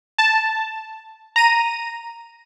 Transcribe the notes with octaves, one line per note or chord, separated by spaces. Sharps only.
A5
A#5 D#7